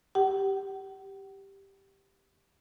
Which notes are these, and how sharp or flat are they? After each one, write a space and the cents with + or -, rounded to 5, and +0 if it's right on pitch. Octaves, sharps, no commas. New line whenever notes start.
G4 +0 F#5 +40